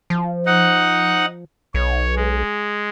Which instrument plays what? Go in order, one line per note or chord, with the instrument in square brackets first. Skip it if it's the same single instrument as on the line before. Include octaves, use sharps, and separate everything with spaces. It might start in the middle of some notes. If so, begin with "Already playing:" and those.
[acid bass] F3
[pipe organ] D#4 F#5
[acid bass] B1 [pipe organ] C#5
[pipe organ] G#3